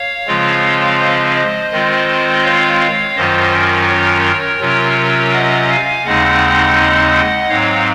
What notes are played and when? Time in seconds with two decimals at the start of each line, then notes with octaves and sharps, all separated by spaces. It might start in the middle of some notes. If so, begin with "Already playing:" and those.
Already playing: C#5 F5
0.27 C#3 F3 G#3 C4 F4
1.00 C5 D#5
1.36 C5 D#5
1.72 D#3 G#3 C4 F4
2.44 C#5 F5
2.80 C#5 F5
3.16 F#2 D#3 F#3 C#4 F4 C5 D#5
3.52 A#4
3.89 A#4 C#5
4.60 C3 F#3 C#4 F4
5.33 D#5 F#5
5.69 F5 G#5
6.05 D#2 C#3 G#3 C4 D#4 D#5 F#5
7.49 G#2 F#3 C4 C#5 F5